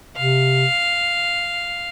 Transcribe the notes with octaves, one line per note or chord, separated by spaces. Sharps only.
C3 F5